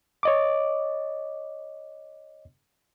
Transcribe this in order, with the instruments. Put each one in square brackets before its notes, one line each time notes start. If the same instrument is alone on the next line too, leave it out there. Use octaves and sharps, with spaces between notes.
[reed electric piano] C#5 D#5 D6